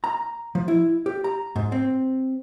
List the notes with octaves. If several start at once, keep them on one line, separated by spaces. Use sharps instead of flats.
A#5
F3
E4
G4
A#5
G#2
C4